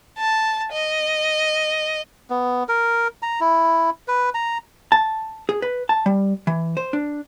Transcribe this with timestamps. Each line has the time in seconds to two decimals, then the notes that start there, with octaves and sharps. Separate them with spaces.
0.19 A5
0.73 D#5
2.30 B3
2.69 A#4
3.22 A#5
3.41 E4
4.08 B4
4.34 A#5
4.92 A5
5.49 G#4
5.62 B4
5.89 A5
6.06 G3
6.47 E3
6.77 C5
6.93 D4